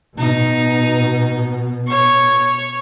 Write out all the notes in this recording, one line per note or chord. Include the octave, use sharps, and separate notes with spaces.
B2 D#4
C#5 C#6